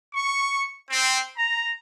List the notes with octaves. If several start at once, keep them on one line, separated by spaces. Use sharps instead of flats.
C#6
C4
A#5